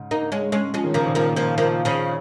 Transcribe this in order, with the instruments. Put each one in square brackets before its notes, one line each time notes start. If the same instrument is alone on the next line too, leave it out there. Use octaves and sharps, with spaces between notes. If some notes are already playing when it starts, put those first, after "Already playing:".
Already playing: [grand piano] G#2 C#3
[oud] A#3 D#4
G#3 C#4
G#3 C#4
[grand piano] F3 [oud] G#3 C#4
[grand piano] D#3
[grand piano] C#3 [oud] F3 A#3
[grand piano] A#2 D#3
[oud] F3 A#3
F3 A#3
F3 A#3
C#3 F3